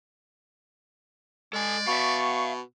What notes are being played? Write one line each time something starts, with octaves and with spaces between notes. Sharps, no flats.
G#3 A4 D5 G#5
B2 E5 F5 C#6